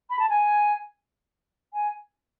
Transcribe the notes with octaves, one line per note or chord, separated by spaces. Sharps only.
B5
A5
G#5
G#5